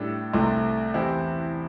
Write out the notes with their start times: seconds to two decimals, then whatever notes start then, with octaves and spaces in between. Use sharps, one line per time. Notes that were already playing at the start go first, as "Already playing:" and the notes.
Already playing: A2 G3 D4 A4
0.33 C2 C3 A3
0.94 E2 E3 C4 E4 G4